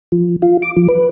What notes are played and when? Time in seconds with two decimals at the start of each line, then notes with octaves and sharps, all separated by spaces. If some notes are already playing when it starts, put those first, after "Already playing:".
0.12 F3
0.42 F4
0.62 D6
0.76 F3
0.88 B4